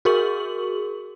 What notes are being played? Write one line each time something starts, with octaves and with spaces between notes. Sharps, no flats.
F#4 G#4 A#4 C#6 F#7